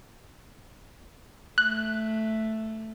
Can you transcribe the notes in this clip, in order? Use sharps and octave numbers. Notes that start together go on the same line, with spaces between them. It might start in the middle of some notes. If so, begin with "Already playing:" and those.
A3 F#6